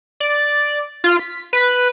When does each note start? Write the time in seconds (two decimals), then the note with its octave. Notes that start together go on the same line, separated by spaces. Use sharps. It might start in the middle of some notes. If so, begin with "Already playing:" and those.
0.20 D5
1.04 F4
1.20 B6
1.53 B4